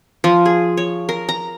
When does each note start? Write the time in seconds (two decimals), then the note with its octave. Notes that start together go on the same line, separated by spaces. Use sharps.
0.24 F3
0.45 G#4
0.77 C#5
1.09 A#4
1.29 A#5